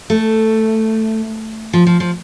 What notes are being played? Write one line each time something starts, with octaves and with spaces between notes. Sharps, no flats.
A3
F3
F3
F3